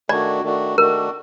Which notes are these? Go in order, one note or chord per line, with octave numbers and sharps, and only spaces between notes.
D#3 A3 D4 F#4 D5
D#3 A3 D4 F#4
D#3 A3 D4 F#4 A#4